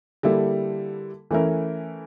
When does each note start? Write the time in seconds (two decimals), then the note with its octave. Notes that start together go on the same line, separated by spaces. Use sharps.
0.23 D3 G3 A#3 E4 A4
1.31 E3 A3 C#4 E4 A#4